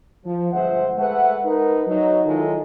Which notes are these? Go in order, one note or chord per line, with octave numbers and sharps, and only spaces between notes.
F3
G1 G#3 C5 E5 F#5
G#3 A3 B4 E5 F#5
D#4 A#4 B4
F#3 D#4
D#3 F#3 G#3 E4 F4 A4